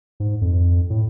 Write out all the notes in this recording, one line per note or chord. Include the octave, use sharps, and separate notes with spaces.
G#2
F2
A2